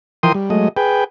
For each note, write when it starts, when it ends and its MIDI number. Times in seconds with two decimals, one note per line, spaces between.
0.23 0.32 52
0.23 0.32 53
0.23 0.32 70
0.23 0.32 79
0.23 0.32 84
0.23 0.32 87
0.34 0.50 55
0.50 0.68 54
0.50 0.68 56
0.50 0.68 57
0.50 0.68 75
0.77 1.04 68
0.77 1.04 71
0.77 1.04 79